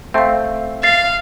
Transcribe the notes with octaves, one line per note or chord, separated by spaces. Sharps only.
A3 C4 E5 F5
F5 A6 C7